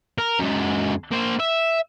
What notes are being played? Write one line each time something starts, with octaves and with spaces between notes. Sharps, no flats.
A#4
F#2 G#3
A#3 C5
E5